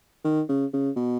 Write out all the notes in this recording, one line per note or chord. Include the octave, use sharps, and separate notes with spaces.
D#3
C#3
C#3
B2